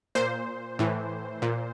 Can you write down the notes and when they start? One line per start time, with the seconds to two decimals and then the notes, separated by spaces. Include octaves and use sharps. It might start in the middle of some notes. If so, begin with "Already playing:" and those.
0.15 A#2 C5
0.79 A2 E3
1.42 A#2